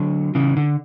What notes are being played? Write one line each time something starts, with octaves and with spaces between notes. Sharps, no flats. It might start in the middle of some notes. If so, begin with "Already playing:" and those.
Already playing: D3 F#3
C#3 E3
D3